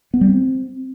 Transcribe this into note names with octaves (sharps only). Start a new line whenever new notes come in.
B3
G3
C4